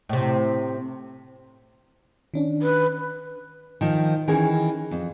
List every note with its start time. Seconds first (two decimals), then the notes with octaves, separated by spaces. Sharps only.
0.09 A2 C3
2.34 D#3 C#4 D4
2.62 B4
3.81 D#3 F3
4.28 D#3 E3 C#4 G#4
4.91 F2